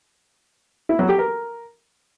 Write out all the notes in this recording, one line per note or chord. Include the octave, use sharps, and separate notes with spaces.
E4
F#3
G4
A#4